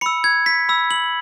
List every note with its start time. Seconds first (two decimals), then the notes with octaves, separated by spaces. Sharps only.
0.01 B5 E6 C#7
0.24 G#6
0.46 B6
0.69 B5 E6
0.91 F#7